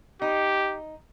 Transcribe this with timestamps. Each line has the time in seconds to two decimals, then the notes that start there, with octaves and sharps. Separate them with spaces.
0.22 D#4 G4